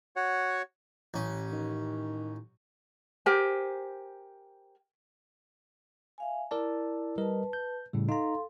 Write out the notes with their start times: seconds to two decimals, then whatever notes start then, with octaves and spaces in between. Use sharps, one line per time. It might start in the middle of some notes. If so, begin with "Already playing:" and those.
0.16 F#4 C#5 F#5
1.14 A1 C#4
1.52 D#3
3.26 G4 A#4 C5 G#5
6.18 E5 F5 G#5
6.51 E4 A#4 D5 A5
7.18 G3 A#4 B4 D#5 A5
7.53 G6
7.93 A2 C#3 G3
8.09 D#4 A4 F5 A#5 C6